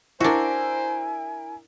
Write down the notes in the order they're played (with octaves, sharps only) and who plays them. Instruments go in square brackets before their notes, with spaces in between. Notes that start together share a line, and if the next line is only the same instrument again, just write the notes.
[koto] D4 F#4 [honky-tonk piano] E4 A#4 [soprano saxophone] C5 [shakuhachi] G#5